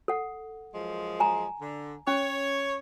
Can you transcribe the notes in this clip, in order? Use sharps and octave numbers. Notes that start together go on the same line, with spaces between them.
A4 F#5
F#2 F3 G#3
G#5 A#5
D3
C#4 C#5